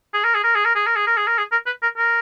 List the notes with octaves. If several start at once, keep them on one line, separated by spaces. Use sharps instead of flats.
G#4
A#4
G#4
A#4
G#4
A#4
G#4
A#4
G#4
A#4
G#4
A#4
G#4
A#4
B4
A#4
A#4